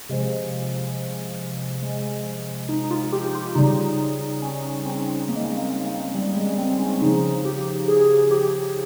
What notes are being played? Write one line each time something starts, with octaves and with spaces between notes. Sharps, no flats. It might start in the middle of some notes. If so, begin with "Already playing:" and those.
C3 F3 G#3
G#3
D#4
F4
G4
F4
C#3 G3 D#4
C#4
C4
A#3
G#3
A#3
A#3
A#3
G3
G#3
C4
C#4
C#3 F3 D#4
G4
G#4
G4